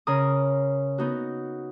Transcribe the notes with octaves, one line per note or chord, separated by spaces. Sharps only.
C#3 A#4 D#6
B3 D#4 F#4